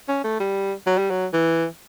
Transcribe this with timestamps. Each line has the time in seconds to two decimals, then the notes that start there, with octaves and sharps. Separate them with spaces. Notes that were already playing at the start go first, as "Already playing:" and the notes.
0.08 C#4
0.24 A3
0.40 G3
0.87 F#3
0.98 G3
1.10 F#3
1.33 E3